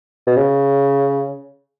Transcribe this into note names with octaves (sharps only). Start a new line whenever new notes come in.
B2
C#3